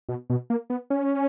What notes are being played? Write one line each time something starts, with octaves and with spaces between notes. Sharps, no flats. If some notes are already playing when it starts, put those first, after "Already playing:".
B2
B2
A#3
B3
C#4